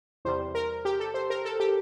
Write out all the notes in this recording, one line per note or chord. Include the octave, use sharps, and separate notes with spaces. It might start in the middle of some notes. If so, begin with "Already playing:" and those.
E2 C3 G3 C5
A#4
G4
A4
C5
A#4
A4
G4